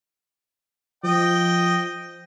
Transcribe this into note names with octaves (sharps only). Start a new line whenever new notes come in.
F3 D#5 G5